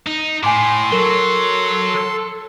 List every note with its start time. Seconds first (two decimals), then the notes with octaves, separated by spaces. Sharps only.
0.07 D#4
0.43 A2 G#5 C6 D6
0.92 F#3 A4 A#4 G7